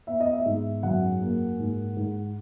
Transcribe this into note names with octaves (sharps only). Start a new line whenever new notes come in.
B3 E5
D#5
E5
G#2
F#2 F#5
A#3
G#2
G#2